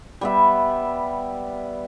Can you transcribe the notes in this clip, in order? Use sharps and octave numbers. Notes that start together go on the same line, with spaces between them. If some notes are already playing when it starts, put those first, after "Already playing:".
G3 B3 E5